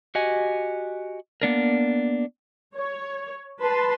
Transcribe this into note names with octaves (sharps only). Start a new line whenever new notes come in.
F#4 G4 D#5 G#5
A#3 B3 D4 A#4
C#5
B4 A5 C6